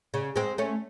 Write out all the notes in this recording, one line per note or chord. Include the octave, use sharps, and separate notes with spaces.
C#3
G#3 C4
A3 C#4